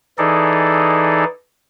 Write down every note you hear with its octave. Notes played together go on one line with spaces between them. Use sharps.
E3 D#4 G#4 A4 D5